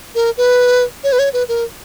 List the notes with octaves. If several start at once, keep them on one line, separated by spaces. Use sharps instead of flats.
A#4
B4
C#5
B4
C#5
B4
A#4